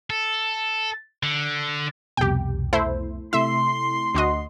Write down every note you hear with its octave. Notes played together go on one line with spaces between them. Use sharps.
A4
D3
C2 F2 B2 G4 G5
A3 E4 C5
C3 A3 E4 E5 C6
D2 F#4 D#5